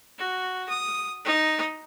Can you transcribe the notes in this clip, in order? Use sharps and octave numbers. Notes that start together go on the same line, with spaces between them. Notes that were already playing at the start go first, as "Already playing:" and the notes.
F#4
D#6
D#4